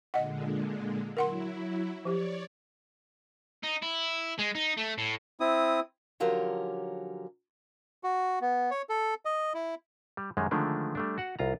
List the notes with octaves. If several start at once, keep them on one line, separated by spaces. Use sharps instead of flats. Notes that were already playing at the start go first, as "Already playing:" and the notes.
A#2 D3 G#3 D#5 F#5
F#3 E4 A#4 F#5 C6
F3 G4 C#5 D5
D#4
E4
G#3
D#4
A3
A2
C4 E4 D#6
D3 F3 F#3 C#4 G4 A#4
F#4
B3
C#5
A4
D#5
E4
G3
F#2 D#3 G3 G#3
D3 D#3 F3 G#3 A3 D4
G3 A3 D4
F#4 F#5
C2 F4 A#5